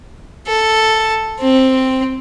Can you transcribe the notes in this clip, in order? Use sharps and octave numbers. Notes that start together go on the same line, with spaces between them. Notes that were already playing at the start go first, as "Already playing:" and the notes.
A4
C4